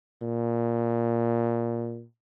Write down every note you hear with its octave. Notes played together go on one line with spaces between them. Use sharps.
A#2